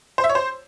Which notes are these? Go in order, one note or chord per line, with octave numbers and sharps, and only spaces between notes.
C5
E5
C#5
C5